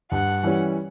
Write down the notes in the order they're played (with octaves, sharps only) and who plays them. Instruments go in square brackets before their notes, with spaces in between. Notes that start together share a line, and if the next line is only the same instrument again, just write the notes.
[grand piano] G2 [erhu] F#5
[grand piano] E3 G3 C#4